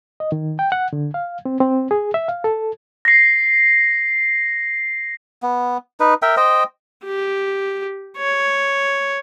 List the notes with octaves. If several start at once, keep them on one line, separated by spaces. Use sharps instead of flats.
D#5
D#3
G5
F#5
D3
F5
C4
C4
G#4
E5
F5
A4
A#6 C7
B3
D#4 B4
A#4 E5 G5
C5 D#5 G5
G4
C#5